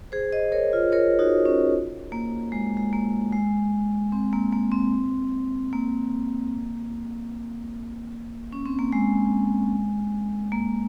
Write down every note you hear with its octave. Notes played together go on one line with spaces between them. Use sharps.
G#4 C5
C5 D#5
A#4 C#5
F4
A#4 C#5
D#4 F#4
C#4
A#3
G#3
G#3
A#3
G#3
C4
A#3
A#3
C4
A#3
C#4
C4
A#3
G#3
A#3